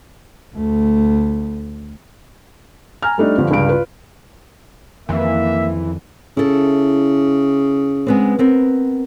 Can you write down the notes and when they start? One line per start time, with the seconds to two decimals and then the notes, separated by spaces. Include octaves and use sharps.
0.55 D2 A3
3.02 G#5 A#5 F6
3.18 G3 A3 D4 D#4
3.38 G2 D3 F3
3.51 C#2 G2 F5 D7
3.69 F4 B4
5.09 F2 D#3 E3 A#3 E5
6.37 C#3 E4 A4
8.07 G#3 B3 C4
8.39 B3 C4 A#4